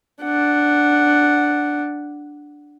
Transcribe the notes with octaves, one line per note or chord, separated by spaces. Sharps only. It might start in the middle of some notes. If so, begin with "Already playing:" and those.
D4 F#5